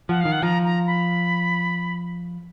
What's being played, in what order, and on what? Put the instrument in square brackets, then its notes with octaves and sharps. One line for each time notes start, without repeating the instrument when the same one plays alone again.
[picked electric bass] F3 [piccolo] F#5
[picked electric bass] D#3 [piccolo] F5
[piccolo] F#5
[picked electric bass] F3 [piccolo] A#5
[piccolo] A#5
B5